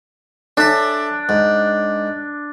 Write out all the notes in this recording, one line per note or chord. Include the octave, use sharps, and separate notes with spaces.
D4 A4 E5
G#2